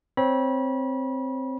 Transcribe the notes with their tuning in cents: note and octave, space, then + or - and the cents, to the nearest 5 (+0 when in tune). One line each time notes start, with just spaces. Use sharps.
C4 +0 C#5 +0 B5 -30